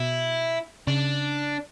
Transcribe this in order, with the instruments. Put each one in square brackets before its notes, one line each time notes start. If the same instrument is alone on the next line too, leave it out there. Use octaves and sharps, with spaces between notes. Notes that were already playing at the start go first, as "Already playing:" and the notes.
Already playing: [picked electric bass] B2 [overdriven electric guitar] E4
[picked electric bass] C#3 [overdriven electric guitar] D4